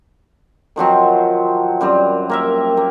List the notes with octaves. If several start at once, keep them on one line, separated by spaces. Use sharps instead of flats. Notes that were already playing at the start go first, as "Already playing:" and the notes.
D#3 F3 F#3 C4
F#2 G3 C4 B4
A#3 A#4 E5
A#3